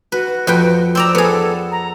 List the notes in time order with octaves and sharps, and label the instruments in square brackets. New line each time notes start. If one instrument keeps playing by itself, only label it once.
[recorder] F#4 [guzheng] B4
[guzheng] F2 B4 G5
[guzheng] C4 D5 A#5 [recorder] E6
[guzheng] B3 G#4 [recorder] A4
[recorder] A#5